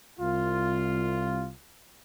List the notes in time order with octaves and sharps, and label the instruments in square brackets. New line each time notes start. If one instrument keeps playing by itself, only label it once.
[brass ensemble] C2 F4